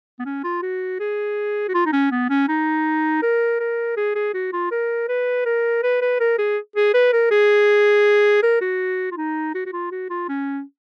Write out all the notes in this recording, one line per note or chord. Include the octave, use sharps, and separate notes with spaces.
B3
C#4
F4
F#4
G#4
F#4
F4
D#4
C#4
B3
C#4
D#4
A#4
A#4
G#4
G#4
F#4
F4
A#4
B4
A#4
B4
B4
A#4
G#4
G#4
B4
A#4
G#4
A#4
F#4
F4
D#4
F#4
F#4
F4
F#4
F4
C#4